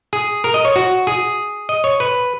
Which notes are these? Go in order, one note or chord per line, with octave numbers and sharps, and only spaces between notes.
G#4
A#4
D#5
C#5
F#4
G#4
D#5
C#5
B4